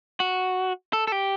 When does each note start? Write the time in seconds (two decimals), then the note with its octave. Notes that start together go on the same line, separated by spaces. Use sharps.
0.20 F#4
0.93 A4
1.07 A4
1.12 G4